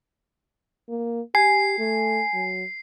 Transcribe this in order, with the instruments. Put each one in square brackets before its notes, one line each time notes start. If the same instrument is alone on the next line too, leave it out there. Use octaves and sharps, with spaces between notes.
[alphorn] A#3
[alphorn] G4 [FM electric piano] G#5 [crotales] C7
[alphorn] A3
F#3